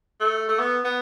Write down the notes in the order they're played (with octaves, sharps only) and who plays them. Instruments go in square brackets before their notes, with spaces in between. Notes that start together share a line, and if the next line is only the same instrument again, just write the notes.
[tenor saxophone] A3
A3
B3
B3